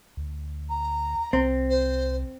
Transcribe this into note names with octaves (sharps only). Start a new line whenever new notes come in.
D2
A#5
C2 C4
C5